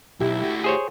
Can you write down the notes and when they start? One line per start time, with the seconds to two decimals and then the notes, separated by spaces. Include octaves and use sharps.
0.20 B1 E4 G4
0.41 A3 F#4
0.64 G#4 C5 C#5